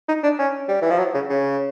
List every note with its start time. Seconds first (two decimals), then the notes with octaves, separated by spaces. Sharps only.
0.08 D#4
0.23 D4
0.39 C#4
0.68 G3
0.82 E3
0.90 F3
0.98 F#3
1.14 C#3
1.30 C#3